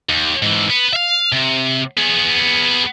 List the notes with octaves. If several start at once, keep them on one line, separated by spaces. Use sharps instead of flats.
D#2
G#2 E3
B3
E5 F5
C3
B3 G#4